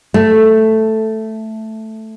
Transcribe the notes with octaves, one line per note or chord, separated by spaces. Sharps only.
A3